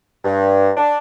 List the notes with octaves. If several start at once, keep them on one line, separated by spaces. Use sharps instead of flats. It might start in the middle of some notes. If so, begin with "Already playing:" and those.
G2
D4